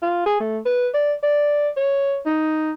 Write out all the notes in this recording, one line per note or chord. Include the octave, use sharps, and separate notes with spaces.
F4
G#4
A3
B4
D5
D5
C#5
D#4